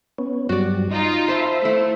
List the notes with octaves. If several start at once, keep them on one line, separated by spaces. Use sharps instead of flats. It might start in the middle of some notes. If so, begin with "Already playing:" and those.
B3 C#4
G2 F#3 G3 F#4 D5
D#4 F4 D#5
C5 E5 A5 B5 C6
A3 E4